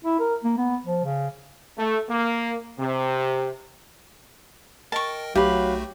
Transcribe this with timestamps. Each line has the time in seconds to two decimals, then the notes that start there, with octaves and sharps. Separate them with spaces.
0.05 E4
0.20 A#4
0.44 A#3
0.58 B3
0.85 F3
1.04 C#3
1.77 A3
2.09 A#3
2.78 C3
4.92 A#4 D#5 G5 A5 C#6
5.35 B1 F#3 A3 F#4 G4 B4 F5